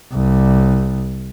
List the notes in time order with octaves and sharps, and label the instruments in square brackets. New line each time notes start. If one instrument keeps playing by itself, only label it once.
[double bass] C2